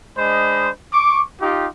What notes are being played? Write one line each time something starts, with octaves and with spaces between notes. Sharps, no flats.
G#3 D4 C5 D#5 B5
C#6 D6
D#4 F4 G4